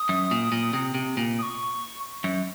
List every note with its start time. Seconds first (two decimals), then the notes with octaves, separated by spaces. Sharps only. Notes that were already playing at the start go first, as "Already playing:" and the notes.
Already playing: D#6
0.09 F#2
0.31 A#2
0.52 A#2
0.73 C3
0.95 C3
1.17 A#2
1.39 D#6
1.43 C#6
2.24 F#2